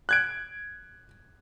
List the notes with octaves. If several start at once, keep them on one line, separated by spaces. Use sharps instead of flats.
F#6 G#6 D7